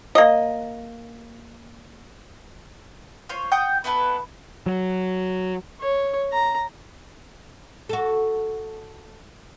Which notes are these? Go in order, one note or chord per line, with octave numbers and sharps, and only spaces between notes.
A#3 D#5
F4 C5 C#5
F#5 G5 D#6 G6
B3 E4 A4 B4
F#3
C#5
A#5
F#4 A4